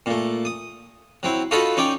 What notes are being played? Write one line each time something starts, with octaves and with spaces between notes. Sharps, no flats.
A#2 A3
D#6
F#3 C4 E4
D#4 F4 F#4 A4 D#5 B5
C#4 D#4 D5 G5